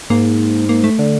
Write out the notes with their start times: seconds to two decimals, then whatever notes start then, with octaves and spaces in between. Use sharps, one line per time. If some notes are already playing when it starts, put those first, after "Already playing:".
0.10 G#2 A#3
0.69 A#3
0.84 A3
0.99 D3